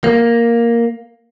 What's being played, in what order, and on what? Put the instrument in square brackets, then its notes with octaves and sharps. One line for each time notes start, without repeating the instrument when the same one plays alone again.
[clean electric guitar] A#3